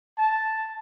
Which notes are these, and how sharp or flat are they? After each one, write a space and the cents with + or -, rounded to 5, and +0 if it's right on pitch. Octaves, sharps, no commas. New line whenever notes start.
A5 +0